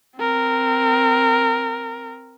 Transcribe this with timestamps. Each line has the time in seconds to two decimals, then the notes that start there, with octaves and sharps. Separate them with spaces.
0.18 C4 A#4